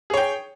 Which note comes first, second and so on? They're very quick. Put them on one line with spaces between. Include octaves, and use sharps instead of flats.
G#4 C#5 G5